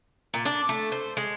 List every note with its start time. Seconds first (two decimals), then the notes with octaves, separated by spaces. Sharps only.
0.34 A#2
0.45 D4
0.69 A3
0.92 C5
1.17 G#3